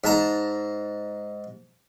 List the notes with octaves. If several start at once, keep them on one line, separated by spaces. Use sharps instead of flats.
G#2 A5 A#5